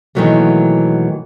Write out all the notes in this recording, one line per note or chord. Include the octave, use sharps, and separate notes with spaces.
B2 D#3 E3 F#3 A3 A#3